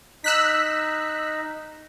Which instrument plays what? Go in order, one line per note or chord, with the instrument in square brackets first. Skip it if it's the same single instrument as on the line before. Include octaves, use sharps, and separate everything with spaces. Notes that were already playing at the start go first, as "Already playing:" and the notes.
[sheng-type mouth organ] D#4 [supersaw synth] E6 F#6 B6